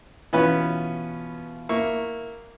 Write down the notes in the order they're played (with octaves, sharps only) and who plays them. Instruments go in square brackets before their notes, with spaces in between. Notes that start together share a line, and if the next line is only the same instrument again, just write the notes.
[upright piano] B2 E3 F4 [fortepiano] B3 C#4 B4
[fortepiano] A#3 E4 C#6